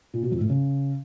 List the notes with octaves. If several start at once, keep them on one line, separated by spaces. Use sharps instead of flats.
A#2
B2
F2
A2
C#3